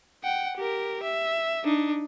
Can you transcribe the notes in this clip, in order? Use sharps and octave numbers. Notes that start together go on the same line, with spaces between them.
F#5 G5
G4 A#4
E5
D4 D#4